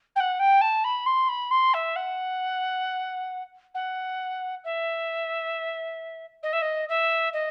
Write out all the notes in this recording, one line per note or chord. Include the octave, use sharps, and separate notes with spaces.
G5
F#5
G5
A5
B5
C6
B5
C6
E5
F#5
F#5
E5
D#5
E5
D#5
E5
D#5